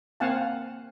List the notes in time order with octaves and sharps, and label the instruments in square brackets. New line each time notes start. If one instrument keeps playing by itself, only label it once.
[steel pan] A#3 C4 F5 F#5 G#5 A5